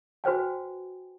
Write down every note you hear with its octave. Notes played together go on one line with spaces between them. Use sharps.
F#4 B4 C5 G5 G#5